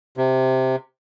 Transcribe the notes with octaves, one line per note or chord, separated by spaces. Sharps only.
C3